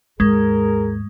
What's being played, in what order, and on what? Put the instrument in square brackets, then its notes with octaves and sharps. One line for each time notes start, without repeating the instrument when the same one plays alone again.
[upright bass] D#2 G#2 [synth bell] G#3 [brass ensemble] G#4 A#4